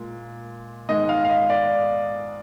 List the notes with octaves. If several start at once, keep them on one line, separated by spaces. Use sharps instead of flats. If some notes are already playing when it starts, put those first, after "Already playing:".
Already playing: A#2 G#3
G#2 D#3 G#3 D#5
F5
F5
D#5
D5